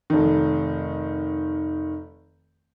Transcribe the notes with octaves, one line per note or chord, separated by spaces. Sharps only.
F1 D#3